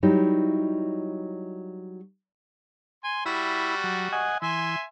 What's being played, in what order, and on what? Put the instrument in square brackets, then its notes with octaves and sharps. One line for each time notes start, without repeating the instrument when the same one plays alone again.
[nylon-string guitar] F#3 G3 D#4 E4
[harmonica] G#5 C6
[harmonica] G3 F#4 [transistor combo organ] E4 B5
[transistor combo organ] F#3
D#5 F#5 G#5
[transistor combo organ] E3 [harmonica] E5 G#5 C6